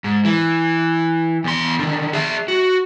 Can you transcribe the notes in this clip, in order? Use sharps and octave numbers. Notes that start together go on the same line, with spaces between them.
G#2
E3
E2 C6
D3 D#3
G#4 E5
F#4